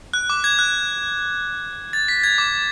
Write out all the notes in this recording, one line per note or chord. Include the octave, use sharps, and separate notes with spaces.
F#6
D6
G#6
F#6
A6
B6
G#6
D6